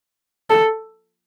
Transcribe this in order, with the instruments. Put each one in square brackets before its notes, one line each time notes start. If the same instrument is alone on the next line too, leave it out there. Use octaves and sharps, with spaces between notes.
[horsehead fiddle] A4